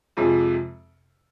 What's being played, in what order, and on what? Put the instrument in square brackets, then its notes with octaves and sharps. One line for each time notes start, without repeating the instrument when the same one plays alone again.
[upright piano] F2 C3 F3 G#3